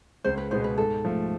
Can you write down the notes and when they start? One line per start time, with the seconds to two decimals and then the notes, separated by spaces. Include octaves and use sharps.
0.24 C#2 C5
0.38 B4
0.51 B2 G#3 B3 C5
0.64 B4
0.78 G#2 A4
1.05 F3 A3